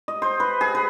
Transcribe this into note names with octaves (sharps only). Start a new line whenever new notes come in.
D#5
C5
B4
G#4
B4